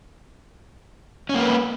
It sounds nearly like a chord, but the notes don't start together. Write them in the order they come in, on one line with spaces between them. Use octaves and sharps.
C#4 A#3 B4